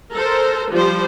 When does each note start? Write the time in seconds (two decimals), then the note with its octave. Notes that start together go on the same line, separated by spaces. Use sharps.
0.14 A4 A#4 C5
0.71 F3 G3 G4 C5